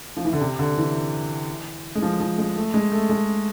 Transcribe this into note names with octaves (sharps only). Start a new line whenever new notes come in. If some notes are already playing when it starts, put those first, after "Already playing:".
F3
E3
D3
C3
D3
E3
G#3
F3
F3
G#3
A3
G#3
A3
G#3